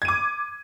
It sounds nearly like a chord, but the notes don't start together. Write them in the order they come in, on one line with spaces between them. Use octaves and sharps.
G#6 D#7 D6